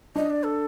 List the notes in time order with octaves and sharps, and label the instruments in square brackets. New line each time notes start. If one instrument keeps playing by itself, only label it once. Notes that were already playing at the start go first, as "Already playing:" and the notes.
[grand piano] D4 [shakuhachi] D#5
[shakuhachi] D5
A4